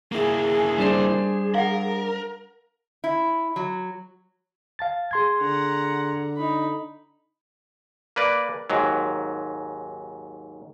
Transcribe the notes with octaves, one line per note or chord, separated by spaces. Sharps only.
A#3 E4 G#4
G3 D4 G#4 C5
A#4 F5 F#5
E4
F#3
F5 A5 A6
G#4 C6 G#6
D3 F#5 A#5
D#4 B5
A#3 B4 D5
D#2 G#2 F#3